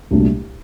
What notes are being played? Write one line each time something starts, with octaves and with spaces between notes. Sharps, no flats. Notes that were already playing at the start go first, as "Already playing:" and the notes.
C2 A#2 F#3 A3 D4